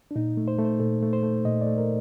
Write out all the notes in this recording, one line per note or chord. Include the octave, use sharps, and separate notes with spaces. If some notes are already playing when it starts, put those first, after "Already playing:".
D4
A#2 D#4
A3
C5
A3
C5
A#2 A4
A3
C5
A3
A#2 D#5
A3 D5
A#4